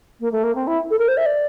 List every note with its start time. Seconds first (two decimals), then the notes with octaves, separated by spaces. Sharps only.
0.20 A#3
0.32 A3
0.44 A#3
0.55 C4
0.67 E4
0.91 A4
0.99 A#4
1.08 C5
1.17 E5
1.26 D5